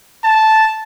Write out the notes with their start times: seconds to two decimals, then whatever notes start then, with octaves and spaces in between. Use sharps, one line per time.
0.24 A5